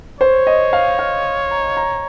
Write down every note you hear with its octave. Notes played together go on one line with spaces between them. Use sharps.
C5 C#5
D#5
F5
F5
A#5
A#5